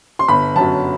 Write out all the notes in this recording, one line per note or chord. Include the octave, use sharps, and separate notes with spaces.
C6
G1 B5
F#2 F#3 A5